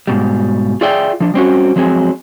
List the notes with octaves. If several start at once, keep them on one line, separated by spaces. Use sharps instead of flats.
G#2 B2 G3
F4 G#4 D5 E5 G5
F3 D4
G3 C4 C#4 F#4
F3 F#3 G#3 C4 G#4